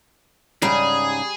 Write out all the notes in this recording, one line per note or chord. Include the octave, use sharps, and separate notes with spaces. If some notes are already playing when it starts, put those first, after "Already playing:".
G#2 C#3 G3 G#4 A#5